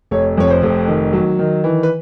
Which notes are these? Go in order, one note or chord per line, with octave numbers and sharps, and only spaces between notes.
F1 C#5
F2 C#5
C5
F1
D#3
F#3
D#3
E3
B4